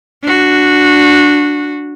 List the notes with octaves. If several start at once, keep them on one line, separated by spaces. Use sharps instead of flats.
D4 F#4